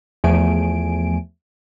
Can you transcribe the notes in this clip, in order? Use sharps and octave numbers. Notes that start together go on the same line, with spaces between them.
E2 F3 A3 G#5 D7